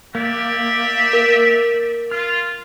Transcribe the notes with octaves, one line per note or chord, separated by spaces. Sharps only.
A#3 G4 D5 E5
A#4
F4 F6